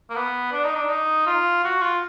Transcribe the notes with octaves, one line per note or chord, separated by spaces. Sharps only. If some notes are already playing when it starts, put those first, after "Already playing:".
A#3
B3
D4
D#4
D4
D#4
F4
F#4
F4